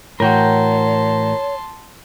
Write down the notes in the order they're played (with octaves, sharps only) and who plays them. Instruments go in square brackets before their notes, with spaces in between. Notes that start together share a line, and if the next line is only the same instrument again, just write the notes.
[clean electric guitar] A2 E3 F#4 [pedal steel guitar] A#4 G5 [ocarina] C#5 [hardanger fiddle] A5 C6